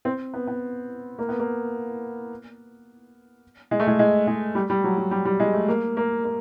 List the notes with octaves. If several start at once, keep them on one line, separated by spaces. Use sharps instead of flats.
C4
B3
B3
A#3
B3
A#3
G#3
A3
G#3
G#3
G#3
G3
G3
F#3
F#3
G3
G3
G#3
A3
A#3
A#3
A#3